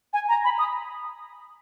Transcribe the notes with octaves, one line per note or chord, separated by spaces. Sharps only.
G#5
A#5
B5
D#6